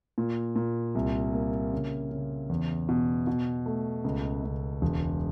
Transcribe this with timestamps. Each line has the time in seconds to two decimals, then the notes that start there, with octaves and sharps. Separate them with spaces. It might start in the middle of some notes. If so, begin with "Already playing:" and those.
0.18 A#2
0.56 A#2
0.95 C2
1.34 A#3
1.73 C#3
2.11 C#3
2.49 E2
2.89 B2
3.27 B2
3.66 A3
4.04 C#2
4.44 C#2
4.82 E1